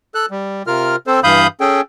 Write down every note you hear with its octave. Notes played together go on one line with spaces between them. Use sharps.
A4 F#6
G3
C3 F4 A#4 F6
C4 A4 C5
G2 E3 F5 B5 D#6 G6
C#4 G#4 A4 G5